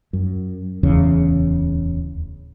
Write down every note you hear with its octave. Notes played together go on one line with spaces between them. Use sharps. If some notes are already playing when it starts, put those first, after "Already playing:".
F#2
D1 E2 C#3